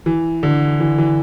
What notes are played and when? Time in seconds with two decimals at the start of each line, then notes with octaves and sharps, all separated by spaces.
0.06 E3
0.43 D3
0.80 E3
0.98 E3